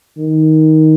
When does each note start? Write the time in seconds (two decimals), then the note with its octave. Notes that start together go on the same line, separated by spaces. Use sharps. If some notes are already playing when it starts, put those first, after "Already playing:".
0.18 D#3